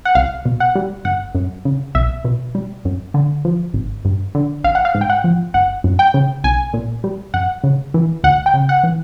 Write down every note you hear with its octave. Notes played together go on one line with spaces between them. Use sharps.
F#5
C2 F5
B2
F#5
G3
G1 F#5
F#2
C#3
B1 E5
B2
G3
F#2
D3
F3
G#1
G2
D3
A1 F5
F#5
F5
G#2
G5
F#5
F3
G1 F#5
F#2
G5
C#3
B1 G#5
A#2
G3
F#2 F#5
C#3
E3
D2 F#5
G5
C#3
F#5
E3